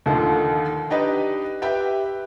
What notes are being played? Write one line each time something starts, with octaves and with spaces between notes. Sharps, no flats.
D#2 D3 D#3 F3
D4 D#4 G4 B4 D#5
G4 B4 E5 G5